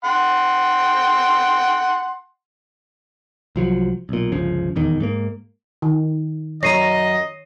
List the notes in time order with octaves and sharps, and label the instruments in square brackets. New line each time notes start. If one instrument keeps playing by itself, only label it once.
[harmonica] F#5 G5 C6
[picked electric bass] C2 F3 F#3
B1 A#2
G1 C#2 C#3 F3
D#1 E2 D#3
G#2 A3 A#3
[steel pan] D#3
[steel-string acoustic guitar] F#2 A#5 [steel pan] C#5 [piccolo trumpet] D#5 [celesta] A#6 C7 D#7